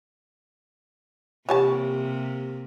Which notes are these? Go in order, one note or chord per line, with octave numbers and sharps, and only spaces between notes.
C3 E3 A#3 F4 G4 C#5 G#5 A5